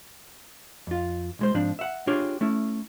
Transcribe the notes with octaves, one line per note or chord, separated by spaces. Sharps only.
F2 F4
B1 G#3 C5
G#2 F3 C4 D4
E5 F#5
D4 F4 G4 G#4 C#5
A3 C#4 E4